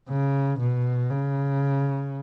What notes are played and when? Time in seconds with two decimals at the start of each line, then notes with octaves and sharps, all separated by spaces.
0.09 C#3
0.59 B2
1.10 C#3